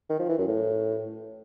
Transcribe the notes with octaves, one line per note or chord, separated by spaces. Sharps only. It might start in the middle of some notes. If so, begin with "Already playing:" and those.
D#3
F3
E3
F#2
A2